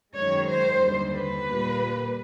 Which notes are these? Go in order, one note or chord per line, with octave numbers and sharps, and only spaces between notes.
F#2 D#3 G#3 C#5
C5
D#2 D3 G3
B4
A#2 G3 A#3